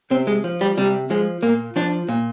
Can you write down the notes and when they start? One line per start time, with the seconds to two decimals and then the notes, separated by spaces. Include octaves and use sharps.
0.10 C3 C4
0.27 G#3
0.44 F3
0.61 G3
0.77 C3 G3
1.10 F3 G#3
1.43 A#2 A#3
1.76 F3 D4
2.08 A#2